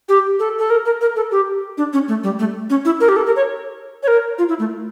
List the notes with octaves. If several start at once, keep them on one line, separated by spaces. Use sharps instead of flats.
G4
A4
A4
A#4
A#4
A#4
A4
G4
D4
C#4
A3
G3
A3
C#4
E4
A#4
G4
A4
A#4
C#5
C#5
A#4
F4
E4
A3